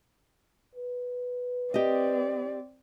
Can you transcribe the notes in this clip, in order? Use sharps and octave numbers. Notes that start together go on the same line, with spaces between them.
B4
C4 G4 D5 D#5